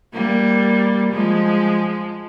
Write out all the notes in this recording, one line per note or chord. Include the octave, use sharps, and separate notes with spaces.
G3 A#3
F3 G#3